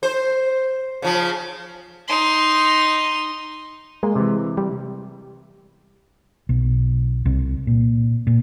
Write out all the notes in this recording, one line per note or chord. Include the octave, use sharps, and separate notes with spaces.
C5
C#3 F3
D#4 C6
G#3 A#3 A#4
C3 E3
G3
B1
C2
A#2
A#2